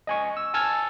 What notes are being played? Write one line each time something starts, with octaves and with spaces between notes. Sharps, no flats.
D#5 G#5 C#6
E6
G#5 A5 E6 F6 G#6 A6